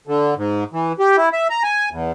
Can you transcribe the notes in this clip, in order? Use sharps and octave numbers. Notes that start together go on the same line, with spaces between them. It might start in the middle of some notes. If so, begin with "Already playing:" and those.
D3
G#2
E3
G4
E4
E5
A#5
G#5
E2